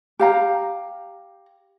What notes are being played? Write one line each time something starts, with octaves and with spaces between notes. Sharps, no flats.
G4 F5 A#5